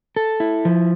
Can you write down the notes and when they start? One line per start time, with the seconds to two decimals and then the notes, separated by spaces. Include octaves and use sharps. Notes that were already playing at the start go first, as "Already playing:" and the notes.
0.16 A4
0.40 E4
0.65 F3